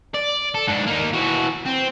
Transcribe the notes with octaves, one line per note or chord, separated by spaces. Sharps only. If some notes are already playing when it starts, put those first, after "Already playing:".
D5
A4
G#2 D4
A#3 D#4
E3 F#4
C4